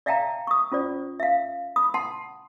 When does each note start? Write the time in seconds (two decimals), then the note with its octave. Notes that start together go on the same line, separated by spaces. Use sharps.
0.06 D5 E5 F5 G5 A5 A#5
0.47 C#6 D#6
0.72 C#4 F4 C5 D5
1.20 E5 F5
1.76 B5 D#6
1.94 F#5 A5 C6